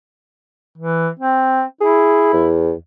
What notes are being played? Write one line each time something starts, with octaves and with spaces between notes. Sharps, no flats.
E3
C4
E4 G#4
E2